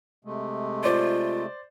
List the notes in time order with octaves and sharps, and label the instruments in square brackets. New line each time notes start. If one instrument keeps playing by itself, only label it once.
[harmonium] C3 G#3 A3
[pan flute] F4 [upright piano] C5 D5